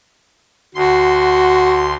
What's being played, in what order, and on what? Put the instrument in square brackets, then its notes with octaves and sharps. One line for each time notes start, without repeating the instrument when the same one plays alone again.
[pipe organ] D2 C6 [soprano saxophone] F#4